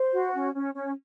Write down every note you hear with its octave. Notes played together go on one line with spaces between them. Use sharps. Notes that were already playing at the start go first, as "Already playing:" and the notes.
Already playing: C5
F#4
C#4
C#4
C#4